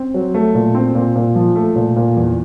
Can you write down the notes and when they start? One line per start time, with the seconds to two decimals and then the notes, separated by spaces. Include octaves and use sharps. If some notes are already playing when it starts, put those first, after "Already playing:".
Already playing: C4
0.14 F#3
0.34 A3
0.55 A#2
0.75 C4
0.95 A#2
1.15 A#2
1.35 F3
1.56 A3
1.76 A#2
1.96 A#2
2.16 E2